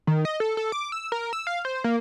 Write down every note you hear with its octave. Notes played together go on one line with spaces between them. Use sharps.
D#3
D#5
A4
A4
D6
E6
A#4
E6
F5
C5
A#3